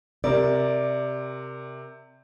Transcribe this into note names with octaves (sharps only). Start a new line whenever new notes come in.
C3 A#4 D5